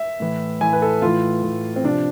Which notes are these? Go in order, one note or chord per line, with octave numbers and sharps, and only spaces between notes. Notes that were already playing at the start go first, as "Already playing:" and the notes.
Already playing: E5
A2 E3
A2 E3 G#5
B4
A4
A2 E3 F4
A2 E3
C4
C3 F3 D4